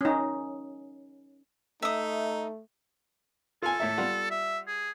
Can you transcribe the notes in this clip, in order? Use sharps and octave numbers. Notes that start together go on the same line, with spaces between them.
C#4 D#4
A3 D#4 E5 D#6
F4 A4 G#5
A2 C#5 E5
G3 F4 F#5
E5
G#4